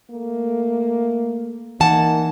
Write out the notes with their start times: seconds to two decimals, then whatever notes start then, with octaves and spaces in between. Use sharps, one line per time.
0.11 A3 A#3
1.80 E3 A#3 D#4 F#5 A5